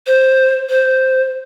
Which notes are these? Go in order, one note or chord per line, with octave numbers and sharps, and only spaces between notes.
C5
C5